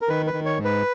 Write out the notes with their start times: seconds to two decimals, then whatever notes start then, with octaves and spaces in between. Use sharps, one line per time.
0.01 A#4
0.09 D#3 B4
0.27 B4
0.33 D#3
0.46 C#5
0.58 G#2
0.65 B4